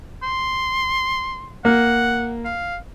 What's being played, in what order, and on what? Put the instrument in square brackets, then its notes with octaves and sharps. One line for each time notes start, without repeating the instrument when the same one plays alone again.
[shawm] C6
[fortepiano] A#3 [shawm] F#5
[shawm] F5